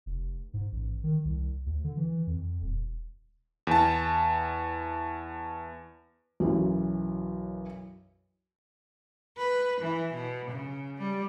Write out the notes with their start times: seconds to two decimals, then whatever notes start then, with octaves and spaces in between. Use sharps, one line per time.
0.06 F1
0.54 G#2
0.72 A1
1.04 D#3
1.25 C2
1.66 D2
1.84 D3
1.97 E3
2.27 F2
2.61 D#1
3.67 E2 A5
6.40 B1 F#2 E3
9.37 B4
9.80 E3
10.13 B2
10.50 C#3
10.97 G3